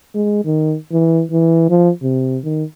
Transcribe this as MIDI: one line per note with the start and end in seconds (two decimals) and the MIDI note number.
0.15 0.45 56
0.45 0.75 51
0.92 1.22 52
1.31 1.68 52
1.70 1.90 53
2.02 2.38 48
2.44 2.64 51